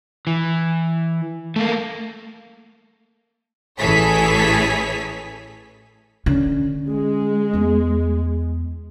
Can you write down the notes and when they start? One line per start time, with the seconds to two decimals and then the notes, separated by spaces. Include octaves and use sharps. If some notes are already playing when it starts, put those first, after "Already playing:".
0.27 E3
1.56 A3 A#3
3.79 A1 E3 G#4 A4 C#5 B6
6.26 D3 C#4
6.90 G#3
7.54 E2 A3